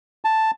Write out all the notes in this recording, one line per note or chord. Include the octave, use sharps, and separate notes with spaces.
A5